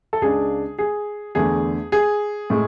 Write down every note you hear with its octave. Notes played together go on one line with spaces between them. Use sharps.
A4
C#2 C#3 G#3 D4 G#4
G#4
E2 D3 A3 G#4
G#4
A2 G#3